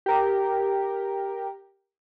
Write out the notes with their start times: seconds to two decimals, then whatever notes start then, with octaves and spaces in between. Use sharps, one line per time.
0.06 G4 A#4